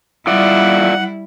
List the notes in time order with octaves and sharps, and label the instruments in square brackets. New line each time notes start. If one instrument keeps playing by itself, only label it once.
[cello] G3 E4 [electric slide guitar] F4 D5 E5 [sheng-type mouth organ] F#5